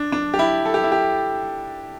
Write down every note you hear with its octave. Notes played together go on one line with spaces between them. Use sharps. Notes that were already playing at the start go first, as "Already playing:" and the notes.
Already playing: D4
D4
G4
E4
A4
G4
E4
G4